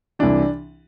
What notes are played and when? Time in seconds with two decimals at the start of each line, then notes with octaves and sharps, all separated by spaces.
0.19 C2 C3 E3 D4